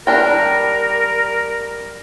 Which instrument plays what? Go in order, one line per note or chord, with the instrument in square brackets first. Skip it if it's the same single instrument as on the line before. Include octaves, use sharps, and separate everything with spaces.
[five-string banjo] G3 D4 G5 [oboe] A#4